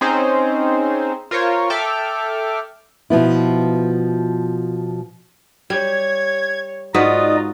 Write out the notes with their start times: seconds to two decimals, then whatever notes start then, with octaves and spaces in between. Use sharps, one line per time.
0.01 C4 C#4 D#4 G#4 C5
1.31 F4 A#4 C5 C#5
1.70 A4 E5 G5 D6 F6
3.10 B2 F3 B3 E4
5.70 G3 C#5 G#6
6.94 G#2 D#4 F4 F#4 B4 D5 D#5 D#6